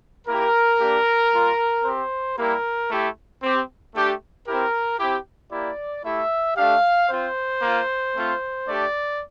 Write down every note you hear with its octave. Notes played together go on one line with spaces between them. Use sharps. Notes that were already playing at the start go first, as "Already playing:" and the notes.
A#3 E4 G4 A#4
A#3 D4 G4
G3 A#3 F4
C4 G4 C5
G3 A#3 E4 G4 A#4
A3 E4 G4
C4 G4
A3 D4 G4
C4 E4 G4 A#4
C4 E4 G4
A#3 E4 G4 D5
A3 E4 G4 E5
A3 D4 G4 F5
C4 F4 C5
A#3 F4
A3 C4 F4
A3 D4 G4 D5